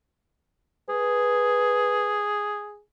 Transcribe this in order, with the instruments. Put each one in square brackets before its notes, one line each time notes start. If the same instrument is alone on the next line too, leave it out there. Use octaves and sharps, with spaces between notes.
[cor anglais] G#4 [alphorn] B4